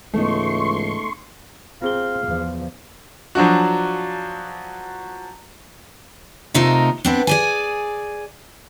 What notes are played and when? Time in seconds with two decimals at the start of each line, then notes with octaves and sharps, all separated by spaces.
0.14 C#2 G#2 E3 A3 B3 D#4 C6 C#6
1.82 C4 F4 G#4 F5 G7
2.25 E2 F3
3.35 F3 F#3 D4 F#4
6.54 C3 A3 D#4 F4 A#4
7.05 B3 C4 D4
7.27 G#4 D5 G#5